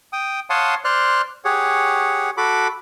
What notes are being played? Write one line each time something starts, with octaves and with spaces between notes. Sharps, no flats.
G5 D#6
C#5 F5 F#5 A5 C6 D#6
C5 D5 C6 F6 F#6
G4 G#4 C#5 F#5
F#4 A4 B5 D6